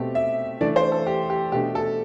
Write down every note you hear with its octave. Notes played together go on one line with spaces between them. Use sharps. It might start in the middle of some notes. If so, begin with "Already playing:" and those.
Already playing: B2 A3 C4 G4
E5
E3 A3 D4 D5
C5
A4
G4
G4
B2 A3 D4 G4
A4